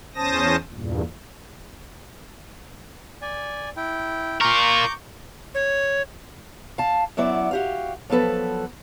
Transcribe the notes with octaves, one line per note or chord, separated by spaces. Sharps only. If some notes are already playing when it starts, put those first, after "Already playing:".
E2 C#4 C5 A5 D#6 A#6
E2 G2 A#2
D5 G#5
E4 G5
F4 A#4 A#5 C#6 D6 G6
C#5
F5 A5
F#2 F#3 B3 E4 D5
F#4 G4 F5
F3 F#3 B3 A4 B4